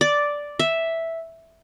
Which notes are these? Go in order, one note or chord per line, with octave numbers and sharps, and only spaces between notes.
D5
E5